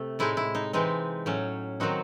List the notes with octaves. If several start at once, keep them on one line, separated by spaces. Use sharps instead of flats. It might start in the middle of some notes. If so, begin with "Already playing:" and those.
Already playing: C3 A3
A2 G#3 D#4 E4
E4
D#4
E3 G#3 C4 D#4
A2 F#3 C#4
D#3 F#3 C4 D#4 F#4